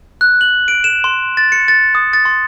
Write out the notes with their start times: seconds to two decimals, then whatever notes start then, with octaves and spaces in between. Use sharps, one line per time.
0.21 F#6
0.41 F#7
0.68 D7
0.84 E7
1.04 C6
1.37 A6
1.52 C#7
1.68 A6
1.95 D#6
2.13 A6
2.25 C6